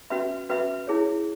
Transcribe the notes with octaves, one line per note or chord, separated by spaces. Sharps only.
C#4 F#4 B4 E5 B5
C#4 F#4 B4 E5 B5
E4 G#4 C#5